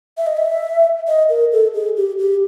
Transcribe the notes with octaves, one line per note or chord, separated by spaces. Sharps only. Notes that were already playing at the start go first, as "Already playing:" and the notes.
E5
D#5
E5
D#5
A#4
A4
G#4
G4
G4